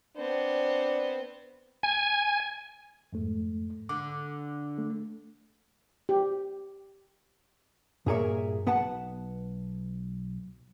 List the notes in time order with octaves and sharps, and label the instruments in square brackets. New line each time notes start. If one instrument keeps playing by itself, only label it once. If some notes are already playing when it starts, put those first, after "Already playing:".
[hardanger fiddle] B3 C4 [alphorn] D4
[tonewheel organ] G#5
[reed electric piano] F2 G#2 A3
[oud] D3 [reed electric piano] D6
[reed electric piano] A3
[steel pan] G4
[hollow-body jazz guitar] G2 A#2 G#4 A#4 C#5 E5
B1 B3 B4 F#5 A5